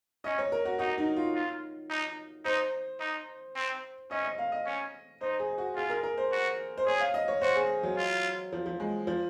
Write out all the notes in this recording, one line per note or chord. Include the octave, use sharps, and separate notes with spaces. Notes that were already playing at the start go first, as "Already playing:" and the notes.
C#4 D#5
C#5
A#4
F#4
D#4 F#4
D#4
F4
F4
D#4
D#4 C5
D#4
C4
C#4 D#5
D#5
F5
D#5
C#4
D#4 C5
G#4
F#4
F4 G#4
A#4
A#4
C5
F#4
C5
G#4 C#5
F5
D#5
C#5
F#4 C5
G#4
F#3
F4
F3
F3
G#3
F3